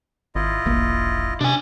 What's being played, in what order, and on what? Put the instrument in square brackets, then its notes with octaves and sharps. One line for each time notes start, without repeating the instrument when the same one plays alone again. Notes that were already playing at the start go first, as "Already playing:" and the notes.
[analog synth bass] G#1 [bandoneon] E4 F4 D#5
[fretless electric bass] E1 A#3 [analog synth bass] A#1
[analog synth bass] C3 [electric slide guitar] D4 G#5